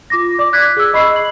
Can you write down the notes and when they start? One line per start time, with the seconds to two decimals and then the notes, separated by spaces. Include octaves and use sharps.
0.10 F4 D6 A#6
0.39 D5 D6
0.53 F#6 G#6 B6
0.77 G#4 E6
0.94 D#5 B5 C#6 C7
1.16 F#7